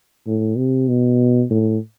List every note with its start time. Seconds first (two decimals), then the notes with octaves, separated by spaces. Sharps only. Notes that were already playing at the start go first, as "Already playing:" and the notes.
0.27 A2
0.57 C3
0.88 B2
1.50 A2